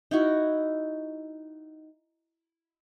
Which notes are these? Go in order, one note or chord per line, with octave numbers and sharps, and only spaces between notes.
D#4 E4 F#4